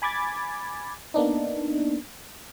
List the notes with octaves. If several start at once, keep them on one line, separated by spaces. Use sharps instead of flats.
G#5 B5 D6 G#6 A6
A#3 B3 D4 D#4